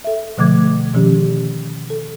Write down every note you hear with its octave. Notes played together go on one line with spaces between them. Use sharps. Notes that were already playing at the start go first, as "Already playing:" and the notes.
A4 E5
B2 D3 F3 A3 D6 G#6
B2 D#3 F3 C#4 G4
A4